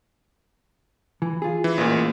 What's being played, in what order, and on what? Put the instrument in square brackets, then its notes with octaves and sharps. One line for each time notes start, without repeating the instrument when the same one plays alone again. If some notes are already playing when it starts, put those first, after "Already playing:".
[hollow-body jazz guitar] E3
F4 G#4
[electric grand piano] E3
A1 A#2